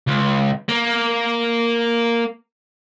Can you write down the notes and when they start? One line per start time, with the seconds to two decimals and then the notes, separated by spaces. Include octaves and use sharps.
0.07 C#2
0.68 A#3